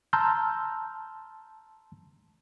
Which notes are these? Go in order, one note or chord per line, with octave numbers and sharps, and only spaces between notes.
A5 A#5 C6 E6 F6 G6